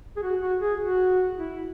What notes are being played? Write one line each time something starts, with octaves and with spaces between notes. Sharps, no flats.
G#4
F#4
F#4
G#4
F#4
E4